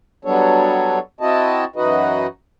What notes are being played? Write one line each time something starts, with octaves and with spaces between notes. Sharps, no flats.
F#3 G3 B3 D4 A4 C#5
C4 E4 F#4 D#5 A5
F#2 E3 D#4 F#4 B4 D#5